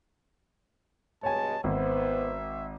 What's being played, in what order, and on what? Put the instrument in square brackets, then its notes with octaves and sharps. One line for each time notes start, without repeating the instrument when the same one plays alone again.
[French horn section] G2 B2 G#3 [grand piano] C#5 G#5 [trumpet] A5
[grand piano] G#1 [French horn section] B3 C5 [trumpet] E5